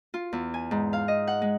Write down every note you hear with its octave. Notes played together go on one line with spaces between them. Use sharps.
F4
E2
G#5
G#2
F5
D#5
F#5
G#3